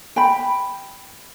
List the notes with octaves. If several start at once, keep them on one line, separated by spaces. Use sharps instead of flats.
G5 B5